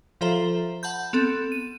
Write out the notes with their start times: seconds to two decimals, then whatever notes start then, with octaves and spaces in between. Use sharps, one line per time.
0.21 F3 F4 A4 C5 E5 A#5
0.83 F#5 A5 B5 G6
1.13 B3 C4 A4
1.52 D#7